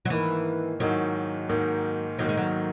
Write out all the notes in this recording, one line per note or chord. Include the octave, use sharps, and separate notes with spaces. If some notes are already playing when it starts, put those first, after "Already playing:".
F#3
G#2 D#3 E3 A#3
G#2 D#3 F#3 A#3
G#2 D#3 A#3
G#2 D#3 F#3 A#3
G#3
F#3